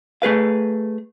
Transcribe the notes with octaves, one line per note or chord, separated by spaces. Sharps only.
A3 G#4 B4 F5